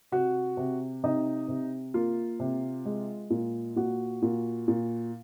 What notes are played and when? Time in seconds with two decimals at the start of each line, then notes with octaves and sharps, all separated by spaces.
0.12 C3 F#4
0.57 C3
1.03 C3 D#4
1.48 C3
1.94 A#3 F4
2.40 C3
2.85 G#3
3.30 A#2
3.76 A#2 F#4
4.22 A#2
4.68 A#2